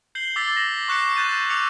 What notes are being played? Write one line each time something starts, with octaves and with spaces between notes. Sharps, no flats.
G6 C7 F#7 G7
D6 E6 A6 B6 G7
A#6 E7 F#7
C#6 F#6 B6 C#7
C#6 F#6 G6 A6 D#7
D6 E6 C#7 F7